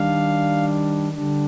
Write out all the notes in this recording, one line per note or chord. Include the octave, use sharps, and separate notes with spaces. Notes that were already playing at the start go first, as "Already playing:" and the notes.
Already playing: D#3 G3 D4 F5
D3 G3 D4